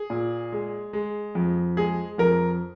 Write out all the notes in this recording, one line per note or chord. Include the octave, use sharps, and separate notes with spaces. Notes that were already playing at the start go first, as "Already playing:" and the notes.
Already playing: G#4
A#2
G#3
G#3
F2
G#3 G#4
F2 A#4